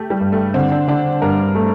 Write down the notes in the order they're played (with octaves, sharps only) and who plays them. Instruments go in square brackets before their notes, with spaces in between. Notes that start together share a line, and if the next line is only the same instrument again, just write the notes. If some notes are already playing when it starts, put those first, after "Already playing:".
Already playing: [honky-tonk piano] A3 G4 A4
G3
[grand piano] G2
[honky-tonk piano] A3
[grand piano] D3 [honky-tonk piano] C4
[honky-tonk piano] D4
[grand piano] D3 [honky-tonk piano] D4
[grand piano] G2 [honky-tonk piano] A#4
[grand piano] A3